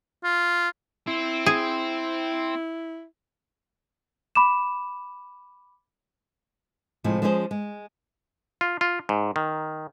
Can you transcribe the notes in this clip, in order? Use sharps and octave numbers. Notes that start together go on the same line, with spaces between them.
F4
C4 E4
G#4
B5 D6 E7
A2 C3 F3 G#3
F3 G#3 C#4 G#4 B4 C5
G#3
F4
F4
G#2
D#3